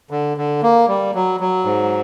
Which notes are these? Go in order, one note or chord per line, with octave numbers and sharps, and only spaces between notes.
D3
D3
A#3
G3
F#3
F#3
G#2